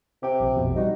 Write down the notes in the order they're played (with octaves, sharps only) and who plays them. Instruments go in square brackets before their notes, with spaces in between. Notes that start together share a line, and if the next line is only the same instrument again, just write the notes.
[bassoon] C3 [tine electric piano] G4 G5
[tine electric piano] A#1
F2 B2
[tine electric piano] G3 F#4 [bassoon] D#4